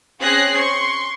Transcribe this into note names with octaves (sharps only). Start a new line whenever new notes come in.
C4 C#4 G#4 F#6 A#6 C7
C6 C#6